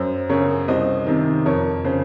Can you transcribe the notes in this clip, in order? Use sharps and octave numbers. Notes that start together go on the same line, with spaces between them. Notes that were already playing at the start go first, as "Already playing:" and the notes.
Already playing: F#2 C5
C#3 A#4 C#5
C2 C5 D#5
C3 D#3
F2 A#4 C#5
C#3 C5